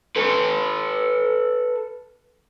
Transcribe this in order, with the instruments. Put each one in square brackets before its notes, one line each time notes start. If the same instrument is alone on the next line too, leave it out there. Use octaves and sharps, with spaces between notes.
[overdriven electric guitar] A4 B4